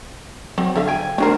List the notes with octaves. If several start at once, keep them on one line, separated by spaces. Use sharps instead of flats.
F#3 C4
D3 A4 E5 F5
G5 G#5
F#3 A3 D4 F#4 A#4 C5